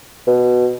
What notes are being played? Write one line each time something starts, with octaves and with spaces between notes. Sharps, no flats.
B2